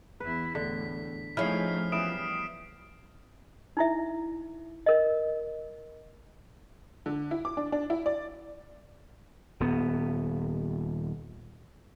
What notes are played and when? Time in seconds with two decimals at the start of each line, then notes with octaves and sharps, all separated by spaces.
0.20 E2 E4 B4
0.55 E2 A2 D3 B6
1.37 F3 A3 C#4 D#4 E4 G#4 F6 C7
1.92 E3 G3 B3 D#6 D7 E7
3.77 D#4 E4 E5
4.86 A#4 D#5
7.06 D3
7.31 E4
7.45 D6
7.57 D4
7.72 D4
7.90 E4
8.06 D5
9.60 D#1 B3